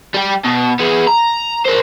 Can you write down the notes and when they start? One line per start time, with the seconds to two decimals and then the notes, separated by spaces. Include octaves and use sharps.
0.14 G3 G5
0.45 B2
0.79 B3 G#4
1.07 A#5
1.66 A#4 C5